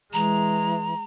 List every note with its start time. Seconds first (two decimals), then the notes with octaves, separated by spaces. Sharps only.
0.13 E3 G#3 A#5